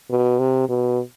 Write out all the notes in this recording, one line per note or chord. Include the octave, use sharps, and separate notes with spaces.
B2
C3
B2